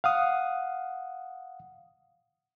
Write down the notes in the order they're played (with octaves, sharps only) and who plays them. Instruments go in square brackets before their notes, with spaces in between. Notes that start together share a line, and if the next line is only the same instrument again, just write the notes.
[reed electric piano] F5 F#5 D#6